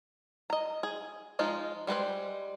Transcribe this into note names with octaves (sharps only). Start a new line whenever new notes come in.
D#5 A#5
G#4
F3 G#3 D#4 F4
G3 G#3 B3 B4 C5